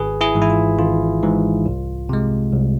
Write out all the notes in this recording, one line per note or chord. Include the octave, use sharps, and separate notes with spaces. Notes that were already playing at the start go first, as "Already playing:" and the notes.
Already playing: G#1 G#4 B4
E4 G#4
G#2 E3
E4
F4
G#1 F4
G#2 E3
C2
C3 G#3
C2